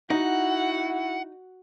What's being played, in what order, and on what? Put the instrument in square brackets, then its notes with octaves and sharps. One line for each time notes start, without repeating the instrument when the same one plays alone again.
[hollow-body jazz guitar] D#4 [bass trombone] E4 [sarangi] F#4 [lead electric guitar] F#5